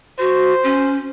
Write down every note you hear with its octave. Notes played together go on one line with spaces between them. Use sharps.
F#4 C5
C#4